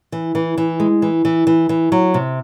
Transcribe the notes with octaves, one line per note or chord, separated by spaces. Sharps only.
E3
E3
E3
G#3
E3
E3
E3
E3
F#3
C3